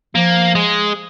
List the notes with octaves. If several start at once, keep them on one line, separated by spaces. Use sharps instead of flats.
F3 A#3
G#3